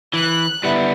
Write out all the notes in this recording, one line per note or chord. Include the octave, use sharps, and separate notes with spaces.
E3 F#6
G3 B3 E4